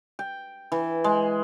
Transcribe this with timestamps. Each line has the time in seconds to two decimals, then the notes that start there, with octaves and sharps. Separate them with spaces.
0.19 G5
0.72 E3
1.04 G#3